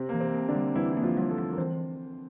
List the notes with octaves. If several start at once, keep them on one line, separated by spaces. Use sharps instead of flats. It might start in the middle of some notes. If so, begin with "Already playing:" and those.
Already playing: C3 C4
E3 A#3
C3 C4
A#3
D3 D4
G3
E3 G3 E4
E4
A#3
F3 F4
G3
A3 A4
G3
A#4
E3 C4 C5